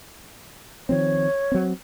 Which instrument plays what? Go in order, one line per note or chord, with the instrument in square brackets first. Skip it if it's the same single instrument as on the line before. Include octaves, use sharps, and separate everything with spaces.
[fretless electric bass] D#3 F3 C4 [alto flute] C#5
[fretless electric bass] F#3 C4